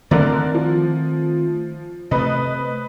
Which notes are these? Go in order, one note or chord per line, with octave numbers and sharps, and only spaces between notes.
D3 D#3 A3 C4 A#4 D5
F3
C3 A3 B4 D#5